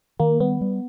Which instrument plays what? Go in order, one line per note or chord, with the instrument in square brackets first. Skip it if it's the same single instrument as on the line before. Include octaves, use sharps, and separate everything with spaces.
[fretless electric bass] D#3 [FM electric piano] A#3
[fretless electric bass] G3 [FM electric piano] B3
[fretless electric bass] G3